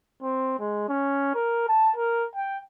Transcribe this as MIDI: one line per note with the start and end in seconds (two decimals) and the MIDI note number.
0.22 0.57 60
0.59 0.85 56
0.89 1.33 61
1.35 1.66 70
1.68 1.91 81
1.96 2.26 70
2.35 2.58 79